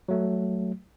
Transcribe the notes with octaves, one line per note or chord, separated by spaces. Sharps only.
F#3 A3